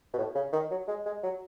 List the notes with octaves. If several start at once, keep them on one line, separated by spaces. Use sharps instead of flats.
B2
A2
C#3
D#3
F#3
G#3
G#3
F#3